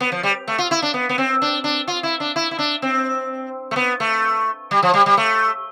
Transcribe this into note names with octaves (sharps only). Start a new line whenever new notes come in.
B3
F3
G3
A3
F4
E4
D4
B3
B3
C4
D4
D4
F4
E4
D4
E4
E4
D4
C4
A3
B3
A3
G3
F3
G3
G3
A3